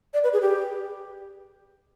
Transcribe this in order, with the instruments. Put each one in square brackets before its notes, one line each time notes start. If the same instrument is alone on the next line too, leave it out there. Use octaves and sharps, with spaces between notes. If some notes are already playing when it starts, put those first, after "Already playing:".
[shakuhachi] D5
B4
G#4
G4